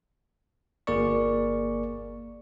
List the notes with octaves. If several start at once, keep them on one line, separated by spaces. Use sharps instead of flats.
G1 A#3 G#4 A#4 D5 C#6